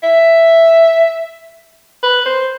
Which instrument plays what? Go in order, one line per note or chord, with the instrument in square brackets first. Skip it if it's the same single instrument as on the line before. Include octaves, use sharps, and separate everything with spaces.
[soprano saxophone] E5
B4
C5